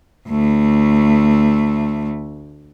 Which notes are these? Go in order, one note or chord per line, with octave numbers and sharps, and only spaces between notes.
D2 A3